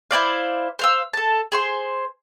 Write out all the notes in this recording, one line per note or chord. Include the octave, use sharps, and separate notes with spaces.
E4 C5 D5 F5
C5 F5 E6
A4 A5
G#4 C5 C6